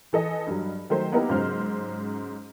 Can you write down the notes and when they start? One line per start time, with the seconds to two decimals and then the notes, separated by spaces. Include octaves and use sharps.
0.13 E3 A4 D#5 G#5
0.47 G2 F#3
0.90 D#3 F#3 A3 C5
1.12 A#3 B3 D#4 E4 G4 A#4
1.30 G#2 C#3 F#3 C5 F6